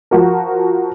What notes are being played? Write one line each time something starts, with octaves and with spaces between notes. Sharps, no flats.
F3 F#4 A#4